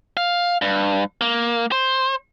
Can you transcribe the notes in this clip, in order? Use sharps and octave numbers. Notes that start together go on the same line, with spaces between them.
F5
G2
A#3
C5